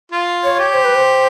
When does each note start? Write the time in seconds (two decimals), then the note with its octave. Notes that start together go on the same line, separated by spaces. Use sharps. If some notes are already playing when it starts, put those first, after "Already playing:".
0.12 F4
0.44 C#5
0.59 G4
0.74 C5
0.85 B4
0.95 C5